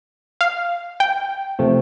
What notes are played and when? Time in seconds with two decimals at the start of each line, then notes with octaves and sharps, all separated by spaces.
0.41 F5
1.00 G5
1.59 C3 F3 A3